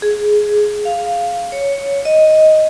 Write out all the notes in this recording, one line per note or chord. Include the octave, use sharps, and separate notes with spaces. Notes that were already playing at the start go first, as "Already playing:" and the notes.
G#4
F5
C#5
D#5